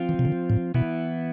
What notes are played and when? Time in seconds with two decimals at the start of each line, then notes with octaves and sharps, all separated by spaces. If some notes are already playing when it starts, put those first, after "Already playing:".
Already playing: F3 C4 F4
0.09 E3
0.19 C3
0.25 D3
0.50 A2
0.74 B2 E3 B3 E4